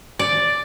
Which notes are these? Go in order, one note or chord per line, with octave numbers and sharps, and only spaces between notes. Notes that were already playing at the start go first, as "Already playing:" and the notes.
D5